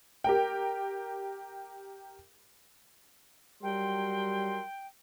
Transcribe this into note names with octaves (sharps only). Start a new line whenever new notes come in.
G4 A#4 G5
F#3 G3 A#4 G5 C6